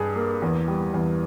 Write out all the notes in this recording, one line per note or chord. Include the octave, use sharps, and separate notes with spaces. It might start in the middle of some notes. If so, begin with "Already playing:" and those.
Already playing: G2 G#4
A#3
E2
G3
E2